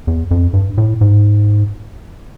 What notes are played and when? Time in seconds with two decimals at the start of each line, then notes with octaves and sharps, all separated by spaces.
0.07 E2
0.31 F2
0.53 G2
0.78 A2
1.01 G#2